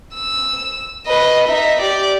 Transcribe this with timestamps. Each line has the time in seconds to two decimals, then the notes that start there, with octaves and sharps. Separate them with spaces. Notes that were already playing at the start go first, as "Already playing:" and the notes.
0.15 E6
1.07 B4 D#5
1.47 D#4 E5
1.80 G4 D5